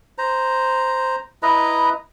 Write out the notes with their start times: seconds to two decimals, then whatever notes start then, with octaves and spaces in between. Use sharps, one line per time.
0.18 C5 A#5
1.43 E4 B4 D#5 A#5